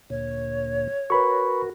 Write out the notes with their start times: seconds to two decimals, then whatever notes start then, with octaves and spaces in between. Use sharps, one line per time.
0.10 D2 A#2 C#5
1.10 F#4 A#4 B4 B5 C#6